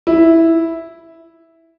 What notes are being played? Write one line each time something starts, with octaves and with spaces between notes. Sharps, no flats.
E4